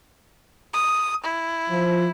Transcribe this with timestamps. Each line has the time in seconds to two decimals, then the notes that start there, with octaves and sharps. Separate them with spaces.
0.74 D#6
1.24 E4
1.70 F3